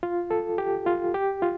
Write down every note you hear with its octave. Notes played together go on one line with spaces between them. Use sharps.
F4
A4
G4
F4
G4
F4